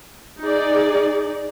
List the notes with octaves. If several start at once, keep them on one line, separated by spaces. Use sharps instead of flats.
D#4 G#4 D5